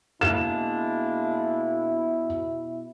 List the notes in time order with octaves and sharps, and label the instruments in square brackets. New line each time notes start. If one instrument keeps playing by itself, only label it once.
[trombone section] B2 E4 [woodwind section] G#3 A#3 D4 [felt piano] E7